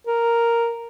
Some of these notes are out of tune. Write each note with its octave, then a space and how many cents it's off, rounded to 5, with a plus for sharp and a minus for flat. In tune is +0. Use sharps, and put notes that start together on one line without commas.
A#4 +0